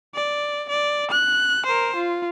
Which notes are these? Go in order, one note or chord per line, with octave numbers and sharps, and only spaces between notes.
D5
D5
F#6
A#4 C5
F4